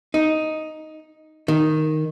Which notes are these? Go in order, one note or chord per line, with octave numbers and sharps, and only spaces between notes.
D#4
D#3